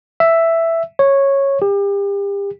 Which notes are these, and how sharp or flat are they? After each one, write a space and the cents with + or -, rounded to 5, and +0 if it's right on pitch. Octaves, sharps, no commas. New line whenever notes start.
E5 +5
C#5 -10
G4 +35